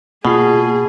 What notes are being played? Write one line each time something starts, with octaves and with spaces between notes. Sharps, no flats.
B2 A#3 F4 G#4 C7